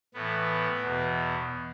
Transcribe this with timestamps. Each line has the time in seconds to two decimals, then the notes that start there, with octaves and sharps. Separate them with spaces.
0.14 A2 E3 B3
0.81 E2 B2